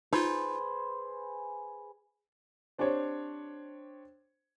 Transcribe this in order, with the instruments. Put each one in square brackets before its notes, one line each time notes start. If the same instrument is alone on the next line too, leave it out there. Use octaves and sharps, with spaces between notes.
[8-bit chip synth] D#4 F4 [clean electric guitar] G#4 B4 C5
[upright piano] C4 D4 G4 C5 C#5